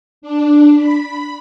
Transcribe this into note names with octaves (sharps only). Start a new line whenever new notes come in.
D4
B5